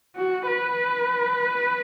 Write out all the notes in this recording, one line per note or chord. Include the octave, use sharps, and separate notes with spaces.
F#4
B4